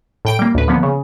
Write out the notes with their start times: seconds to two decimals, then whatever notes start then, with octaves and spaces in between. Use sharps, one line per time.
0.25 A2 G5 D7
0.39 G3 A#3
0.55 D2 A2 B4
0.68 D3 F3 A#3 B3
0.83 C#3